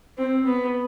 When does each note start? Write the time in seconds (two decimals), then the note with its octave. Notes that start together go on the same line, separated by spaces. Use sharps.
0.18 C4
0.45 B3